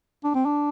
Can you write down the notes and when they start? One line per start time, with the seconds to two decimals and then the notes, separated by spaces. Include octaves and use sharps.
0.24 D4
0.35 C4
0.45 D4